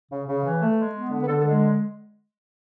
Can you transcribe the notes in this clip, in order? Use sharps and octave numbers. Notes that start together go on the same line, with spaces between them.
C#3
C#3
E3
A3
G#3
B3
D3
B4
D3 A4
A4
G#3